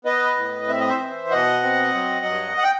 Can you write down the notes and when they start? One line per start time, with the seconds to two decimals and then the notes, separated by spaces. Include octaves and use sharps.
0.05 B3 B4 D#5
0.37 A2
0.68 C4 E5
0.79 D#5
0.89 C5 E5
0.99 E3
1.31 B2 D#5 F#5
1.63 C4
1.94 F#3
2.26 G2
2.58 F#5
2.64 G5